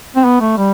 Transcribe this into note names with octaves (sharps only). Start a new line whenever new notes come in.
C4
B3
A3
G3